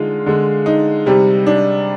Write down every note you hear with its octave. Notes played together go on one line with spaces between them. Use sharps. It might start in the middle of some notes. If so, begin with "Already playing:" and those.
Already playing: D3 G#3 D#4 F4
D3 G#3
D#4
C3 G3
D4